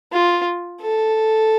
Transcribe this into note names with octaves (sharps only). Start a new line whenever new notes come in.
F4
A4